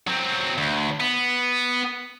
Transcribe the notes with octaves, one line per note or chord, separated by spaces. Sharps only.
F#3 C4
D2
B3